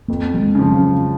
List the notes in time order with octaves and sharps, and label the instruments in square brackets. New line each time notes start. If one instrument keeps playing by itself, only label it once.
[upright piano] F2 [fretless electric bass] A#3
[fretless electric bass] F#3
G#3
[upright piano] C#3 F3
[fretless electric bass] F#3